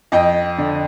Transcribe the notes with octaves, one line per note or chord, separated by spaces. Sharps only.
F2 D#5 G5
D3